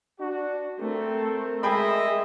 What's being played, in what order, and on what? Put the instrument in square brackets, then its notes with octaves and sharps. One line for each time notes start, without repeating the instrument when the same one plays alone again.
[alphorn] D4 [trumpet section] F#4
[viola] A3 [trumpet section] C4 [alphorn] A#4
[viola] G#3 [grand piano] G#4 G5 B5 [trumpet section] D#5 E5